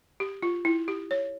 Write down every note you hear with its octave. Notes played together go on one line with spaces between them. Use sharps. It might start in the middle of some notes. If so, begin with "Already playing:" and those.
G4
F4
E4
G4
C#5